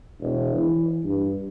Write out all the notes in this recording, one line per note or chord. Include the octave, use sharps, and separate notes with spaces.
E1
E3
G2